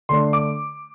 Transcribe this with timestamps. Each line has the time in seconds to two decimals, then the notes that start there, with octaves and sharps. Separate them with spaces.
0.09 D3 A3 D4 C6
0.33 D6